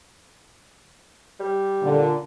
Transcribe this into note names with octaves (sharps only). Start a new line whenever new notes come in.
G3
A#2 D3